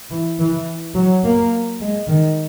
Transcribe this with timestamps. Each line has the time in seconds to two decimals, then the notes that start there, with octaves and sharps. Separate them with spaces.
0.11 E3
0.39 E3
0.95 F#3
1.23 A#3
1.80 G#3
2.08 D#3